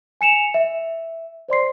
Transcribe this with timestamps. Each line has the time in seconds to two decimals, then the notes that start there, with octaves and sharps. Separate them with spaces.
0.21 G#5 C#7 E7 F7
0.54 E5
1.48 C5 D5 C6 C7